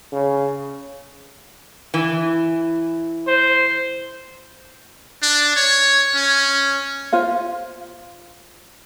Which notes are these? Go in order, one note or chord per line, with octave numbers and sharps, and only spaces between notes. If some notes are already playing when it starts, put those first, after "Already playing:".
C#3
E3
C5
D4
C#5
C#4
F4 C5 F5